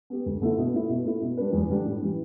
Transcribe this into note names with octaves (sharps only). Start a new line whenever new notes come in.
B3 G4
D2
D3 A3 E4
B2
A3 E4
B2
A3 E4
B2
G3 D4 B4
E2
D3 G3 D4
A2
E3 G3